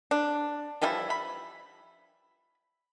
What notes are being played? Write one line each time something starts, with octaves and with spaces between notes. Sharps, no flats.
D4
E3 F3 G3 E4
B5